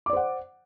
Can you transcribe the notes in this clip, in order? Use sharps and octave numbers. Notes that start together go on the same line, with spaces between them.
C5 D5 F#5 D6